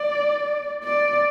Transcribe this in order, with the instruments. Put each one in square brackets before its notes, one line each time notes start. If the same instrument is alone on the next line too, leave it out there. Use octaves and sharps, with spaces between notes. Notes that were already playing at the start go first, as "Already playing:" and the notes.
Already playing: [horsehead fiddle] D5
D5